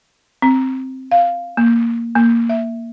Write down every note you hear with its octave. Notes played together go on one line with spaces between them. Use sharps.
C4
F5
A#3
A#3
E5